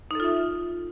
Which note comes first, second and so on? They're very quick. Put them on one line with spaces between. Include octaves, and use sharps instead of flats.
D#4 A4 F4 E5